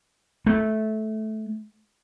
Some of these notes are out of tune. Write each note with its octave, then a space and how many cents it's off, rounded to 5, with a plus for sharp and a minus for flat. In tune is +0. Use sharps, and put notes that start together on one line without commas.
A3 -15